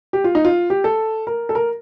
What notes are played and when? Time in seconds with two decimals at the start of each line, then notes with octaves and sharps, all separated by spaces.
0.13 G4
0.24 F4
0.35 D#4
0.45 F4
0.70 G4
0.84 A4
1.27 A#4
1.49 A4
1.55 A#4